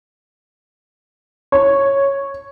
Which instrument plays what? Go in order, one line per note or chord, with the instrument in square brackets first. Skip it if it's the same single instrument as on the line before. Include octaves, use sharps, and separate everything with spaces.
[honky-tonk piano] C#5